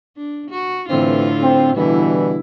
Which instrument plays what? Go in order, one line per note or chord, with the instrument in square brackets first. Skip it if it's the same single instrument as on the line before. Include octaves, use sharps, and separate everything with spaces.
[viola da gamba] D4
F#4
[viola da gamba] A2 D3 F4 [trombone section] E3 C4
[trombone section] C4
[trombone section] B2 E3 G3 [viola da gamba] D3 E4